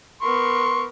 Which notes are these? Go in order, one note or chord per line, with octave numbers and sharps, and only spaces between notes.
B3 A#4 C6 C#6